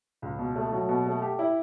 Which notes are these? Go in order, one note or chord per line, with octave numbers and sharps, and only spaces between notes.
C#2
B2
A3
F#3
B2
A3
G4
E4